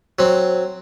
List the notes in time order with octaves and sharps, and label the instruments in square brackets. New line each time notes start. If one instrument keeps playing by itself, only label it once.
[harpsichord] F#3 C4